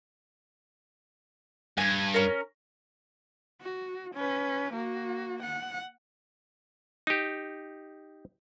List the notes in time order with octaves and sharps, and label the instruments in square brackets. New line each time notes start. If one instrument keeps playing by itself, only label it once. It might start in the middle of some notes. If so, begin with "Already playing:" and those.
[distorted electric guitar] G2 [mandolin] G#5
[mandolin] C#4 A#4
[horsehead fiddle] F#4
C#4 B4
A#3 F#4
F#5
[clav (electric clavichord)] D#4 G4